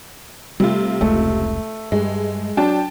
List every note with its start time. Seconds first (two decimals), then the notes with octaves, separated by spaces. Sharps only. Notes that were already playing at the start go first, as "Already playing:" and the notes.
0.60 C3 G3 A3 F4
1.01 F1 C#2 G#3 A3
1.92 G2 G#3
2.57 F#3 D4 G5 A5